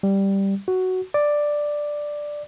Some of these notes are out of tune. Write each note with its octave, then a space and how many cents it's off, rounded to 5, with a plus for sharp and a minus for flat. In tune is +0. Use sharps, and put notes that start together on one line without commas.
G3 +0
F#4 +5
D5 +5